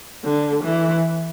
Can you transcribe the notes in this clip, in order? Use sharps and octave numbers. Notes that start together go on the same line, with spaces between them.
D3
E3